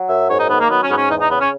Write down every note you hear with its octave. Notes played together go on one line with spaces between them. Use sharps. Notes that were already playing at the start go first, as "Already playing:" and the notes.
Already playing: F#3
F#2 E5
G#2 C#5
D#4
D#3 B3
A#3
F#3 B3
C#4
G#2 B3
C#4
E2 D#4
D#4
C#3 B3
C#4